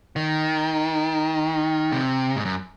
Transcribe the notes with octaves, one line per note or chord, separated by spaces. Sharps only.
D#3
C3
G#2
F#2